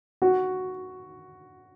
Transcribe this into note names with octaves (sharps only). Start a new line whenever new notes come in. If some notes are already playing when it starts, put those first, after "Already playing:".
F#4